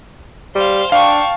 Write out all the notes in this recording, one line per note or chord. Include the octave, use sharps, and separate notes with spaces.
G3 C5 F5
D4 F5 G5 A5 C#6